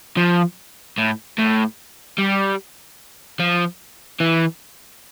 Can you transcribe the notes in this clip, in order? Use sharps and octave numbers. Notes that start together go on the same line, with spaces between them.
F3
A2
A2
G3
F3
E3